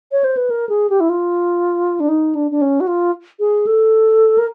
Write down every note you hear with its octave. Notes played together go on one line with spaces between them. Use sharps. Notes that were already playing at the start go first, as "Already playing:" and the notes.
C#5
C5
B4
A#4
G#4
G4
E4
F4
D4
D#4
D4
D4
C#4
F#4
F4
G#4
A4
A#4